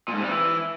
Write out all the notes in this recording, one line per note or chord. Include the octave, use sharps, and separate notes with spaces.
A#2
G#2
C3
G3
E3